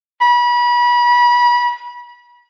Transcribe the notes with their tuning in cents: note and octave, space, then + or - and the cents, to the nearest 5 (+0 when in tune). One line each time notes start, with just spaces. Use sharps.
B5 -30